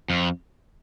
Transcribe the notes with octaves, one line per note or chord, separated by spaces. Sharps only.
F2